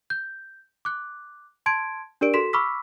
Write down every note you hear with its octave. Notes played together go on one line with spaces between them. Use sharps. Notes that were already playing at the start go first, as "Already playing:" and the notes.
G6
D6 F#6
A5 C6 G#6 D7
D4 G4 A#4 D5 D7
F#4 A4 C6 B6 E7
B5 C#6 D6 E6 F6 B6